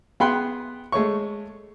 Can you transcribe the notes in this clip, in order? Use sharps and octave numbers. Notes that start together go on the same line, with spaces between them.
B3 G#4 G5 B5 C6 F#6
G#3 A3 C#5 C#6